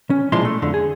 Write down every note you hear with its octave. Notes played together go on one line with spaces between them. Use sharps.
C#4
B1 A#2 F3 G#3 E4 C6
A3
F2 D3
G#4